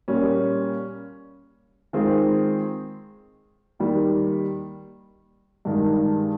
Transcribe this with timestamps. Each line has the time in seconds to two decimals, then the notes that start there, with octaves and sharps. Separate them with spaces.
0.08 A#2 G3 A#3 C#4
1.93 D#3 G#3 C4 F4 G#4
3.79 D#2 D#3 G3
5.65 G2 D#3 G#3